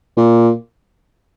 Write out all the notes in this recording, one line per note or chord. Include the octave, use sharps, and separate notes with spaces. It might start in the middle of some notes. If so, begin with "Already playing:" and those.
A#2